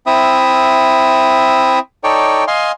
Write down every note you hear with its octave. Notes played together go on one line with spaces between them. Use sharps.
C4 E4 E5 D#6
D#4 A4 C#5 D5 G5
D#5 F5 G#5 C6